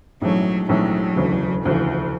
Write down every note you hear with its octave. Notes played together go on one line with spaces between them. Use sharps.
A#1 G#2 E3 F#3 A3 C#4
A#1 G#2 E3 F#3 A3 C#4
E1 D2 C#3 E3
E1 D2 C#3 E3 F3